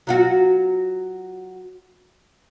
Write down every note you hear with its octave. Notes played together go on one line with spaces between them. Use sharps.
F#3 F4 F#4